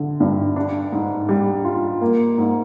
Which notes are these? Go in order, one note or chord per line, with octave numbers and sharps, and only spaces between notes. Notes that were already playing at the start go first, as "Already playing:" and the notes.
Already playing: D3
G2
D4
G#2
G3
F4
A#3
G#2